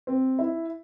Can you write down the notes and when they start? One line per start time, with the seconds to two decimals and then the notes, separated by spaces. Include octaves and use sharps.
0.07 C4
0.39 E4